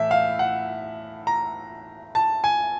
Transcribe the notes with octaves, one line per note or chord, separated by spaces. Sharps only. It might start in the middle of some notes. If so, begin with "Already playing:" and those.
Already playing: A2 E3 E5
F5
F#5
A#5
A5
G#5